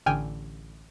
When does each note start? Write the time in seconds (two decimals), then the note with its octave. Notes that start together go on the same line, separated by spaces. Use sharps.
0.06 A1 D3 G5 G#5 F6